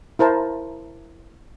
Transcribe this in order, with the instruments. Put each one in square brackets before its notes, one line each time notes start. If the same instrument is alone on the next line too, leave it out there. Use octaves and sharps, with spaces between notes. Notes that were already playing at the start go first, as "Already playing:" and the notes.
[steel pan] E4 A#4 C5 A5